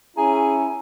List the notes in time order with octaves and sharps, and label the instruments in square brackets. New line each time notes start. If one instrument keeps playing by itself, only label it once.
[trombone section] C#4 E4 [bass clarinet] G#4 [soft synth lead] G#5 [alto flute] A#5